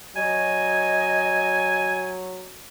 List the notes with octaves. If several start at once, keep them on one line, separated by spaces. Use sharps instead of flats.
F#3 D#5 G#5